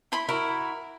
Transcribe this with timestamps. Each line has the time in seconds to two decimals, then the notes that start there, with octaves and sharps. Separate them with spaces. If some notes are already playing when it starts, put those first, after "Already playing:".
0.12 E4 B5 C6
0.29 E4 F#4 A#4